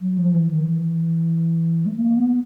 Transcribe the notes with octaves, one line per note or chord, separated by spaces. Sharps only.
F#3
F3
E3
D#3
E3
A3
A#3
B3